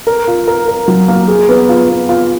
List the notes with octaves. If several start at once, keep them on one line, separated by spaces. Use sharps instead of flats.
A#4
F4
A#4
A#4
F#3
A#3
G#4
B3
F4
B3
F4